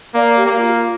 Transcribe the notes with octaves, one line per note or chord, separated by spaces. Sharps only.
A#3 D5
G4
A#3
F4